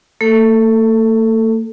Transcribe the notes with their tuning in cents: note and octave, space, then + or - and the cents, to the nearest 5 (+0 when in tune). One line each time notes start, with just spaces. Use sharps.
A3 +45 A4 +10